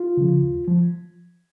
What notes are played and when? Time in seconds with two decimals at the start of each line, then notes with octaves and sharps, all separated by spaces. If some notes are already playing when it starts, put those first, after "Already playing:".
Already playing: F4
0.17 C#3 F3
0.43 D#2
0.68 F3